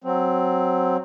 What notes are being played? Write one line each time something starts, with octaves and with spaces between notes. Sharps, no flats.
F#3 C4